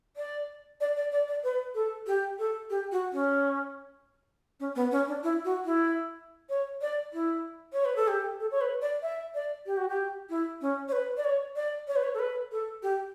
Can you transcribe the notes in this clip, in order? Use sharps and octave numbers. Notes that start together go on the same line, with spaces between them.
D5
D5
D5
D5
D5
B4
A4
G4
A4
G4
F#4
C#4
C#4
B3
C#4
D4
E4
F#4
E4
C#5
D5
E4
C#5
B4
A4
G4
A4
C#5
B4
D5
E5
D5
G4
F#4
G4
E4
C#4
C#5
B4
D5
C#5
D5
C#5
B4
C#5
A4
B4
A4
G4